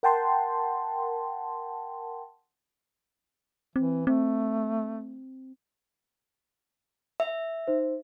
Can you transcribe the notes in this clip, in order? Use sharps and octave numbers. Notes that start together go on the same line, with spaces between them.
A#4 F#5 G5 A5 C6
E3 C4
A3 C4
E5
D#4 C5